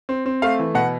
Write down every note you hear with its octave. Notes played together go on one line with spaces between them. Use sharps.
C4
C4
A3 F5
E3
B2 F#5